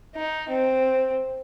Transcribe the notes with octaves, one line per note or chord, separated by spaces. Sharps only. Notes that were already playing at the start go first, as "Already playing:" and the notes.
D#4
C4